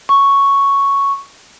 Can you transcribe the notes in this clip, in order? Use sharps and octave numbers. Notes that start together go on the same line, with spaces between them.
C#6